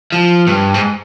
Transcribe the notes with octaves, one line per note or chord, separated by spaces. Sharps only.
F3
G2
G#2